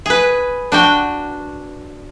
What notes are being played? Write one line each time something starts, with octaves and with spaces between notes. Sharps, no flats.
G#4 B4
D4 F#4 G5